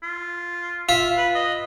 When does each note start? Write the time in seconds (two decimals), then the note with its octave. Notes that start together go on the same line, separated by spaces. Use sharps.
0.03 F4
0.89 F4 E5
1.18 B4
1.35 D#5